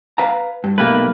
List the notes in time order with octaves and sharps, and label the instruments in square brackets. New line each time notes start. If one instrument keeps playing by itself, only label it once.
[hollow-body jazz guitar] B4 F5 A#5
G2
[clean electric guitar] B1 A#3 B4 [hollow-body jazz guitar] A3 G4